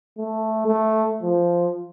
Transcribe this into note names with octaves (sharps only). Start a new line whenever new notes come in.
A3
A3
F3